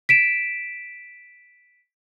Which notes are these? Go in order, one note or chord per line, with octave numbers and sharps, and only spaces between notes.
B6 D7 E7